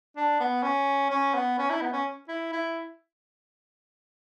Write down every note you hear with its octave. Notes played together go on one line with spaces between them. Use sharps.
D4
B3
C#4
C#4
B3
C#4
E4
B3
C#4
E4
E4